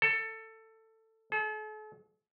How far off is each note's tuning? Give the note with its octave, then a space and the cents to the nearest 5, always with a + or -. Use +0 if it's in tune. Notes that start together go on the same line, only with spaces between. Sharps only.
A4 +15
A4 -45